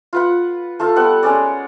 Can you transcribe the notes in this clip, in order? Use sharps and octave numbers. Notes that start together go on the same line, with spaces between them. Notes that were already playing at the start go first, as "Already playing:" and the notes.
F4 B4 F#5
A3 F4 A4 F5
G3 B3 F#5
G#3 C#4 D5